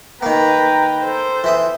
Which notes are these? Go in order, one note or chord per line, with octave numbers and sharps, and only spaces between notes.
D#3 A#3 B4 G5 A#5
A4 C5
E3 E5 D#6